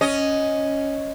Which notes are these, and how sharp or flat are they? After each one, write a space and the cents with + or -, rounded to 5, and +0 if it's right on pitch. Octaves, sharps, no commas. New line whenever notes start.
C#4 +0 D#5 +0